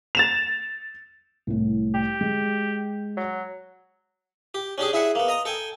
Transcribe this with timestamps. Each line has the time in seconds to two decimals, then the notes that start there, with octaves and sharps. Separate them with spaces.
0.15 A6 E7 F7
1.47 C2 A2
1.94 G4
2.21 G#3
3.17 F#3
4.54 G4
4.78 C#4 D4 G4 G#4
4.93 E4 G#4 E5 F#5
5.15 A#3 B3
5.28 D#5 A#5 D#6
5.45 A4 G5 G#5